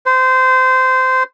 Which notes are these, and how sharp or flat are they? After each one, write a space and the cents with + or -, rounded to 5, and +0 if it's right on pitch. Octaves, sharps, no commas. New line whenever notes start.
C5 -20